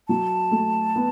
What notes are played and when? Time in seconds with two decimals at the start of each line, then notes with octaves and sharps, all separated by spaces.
0.08 F#3 A5
0.51 A3
0.96 B3